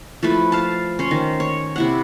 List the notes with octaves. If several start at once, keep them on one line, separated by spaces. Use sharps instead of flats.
F3 A3 E4 B4
F5 A5
C#4 C5
D#3
C#5
C3 E4 F#5